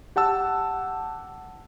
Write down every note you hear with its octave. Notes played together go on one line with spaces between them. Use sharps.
G4 F#5 A5 E6